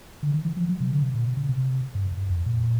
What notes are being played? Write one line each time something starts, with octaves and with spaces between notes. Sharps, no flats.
D3
D#3
E3
F3
F#3
C3
D3
C3
A#2
B2
C#3
C3
G2
F#2
F2
A#2